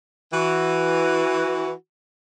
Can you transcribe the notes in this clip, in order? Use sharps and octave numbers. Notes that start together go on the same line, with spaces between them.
E3 F#4